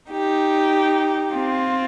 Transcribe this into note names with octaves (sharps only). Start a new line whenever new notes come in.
D#4 G4
C4 F4